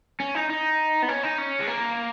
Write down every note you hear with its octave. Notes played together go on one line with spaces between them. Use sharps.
C#4
D#4
D#4
B3
C#4
D#4
C#4
G#3
A#3